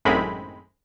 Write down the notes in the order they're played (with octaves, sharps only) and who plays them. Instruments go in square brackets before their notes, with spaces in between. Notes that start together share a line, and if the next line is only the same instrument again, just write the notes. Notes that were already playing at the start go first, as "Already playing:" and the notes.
[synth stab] G#1 F#2 A2 G#3 C4 B5